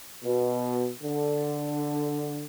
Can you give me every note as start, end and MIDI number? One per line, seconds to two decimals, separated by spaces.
0.23 0.89 47
1.03 2.46 50